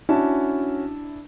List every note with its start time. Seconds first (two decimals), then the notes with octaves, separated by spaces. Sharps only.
0.09 C#4 D4 E4 F#4 A5